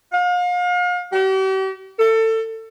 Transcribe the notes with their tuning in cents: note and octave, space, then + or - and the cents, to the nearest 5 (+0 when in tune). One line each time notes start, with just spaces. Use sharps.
F5 +40
G4 -45
A4 +25